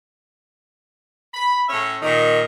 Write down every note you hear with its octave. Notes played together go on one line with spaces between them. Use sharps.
B5
A2 C#4 C#5 E5
A#2 D#3